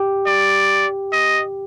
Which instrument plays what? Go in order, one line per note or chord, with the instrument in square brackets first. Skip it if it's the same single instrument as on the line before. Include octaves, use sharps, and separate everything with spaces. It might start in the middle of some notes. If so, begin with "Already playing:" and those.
Already playing: [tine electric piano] G4
[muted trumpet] D5
D#5